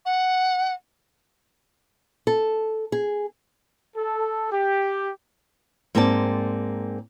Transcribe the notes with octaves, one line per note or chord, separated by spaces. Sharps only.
F#5
A4
G#4
A4
G4
G#2 A#3 C4 C5 D5 A5